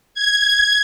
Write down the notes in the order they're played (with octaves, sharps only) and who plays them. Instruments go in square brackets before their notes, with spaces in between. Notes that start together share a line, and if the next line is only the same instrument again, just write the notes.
[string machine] G#6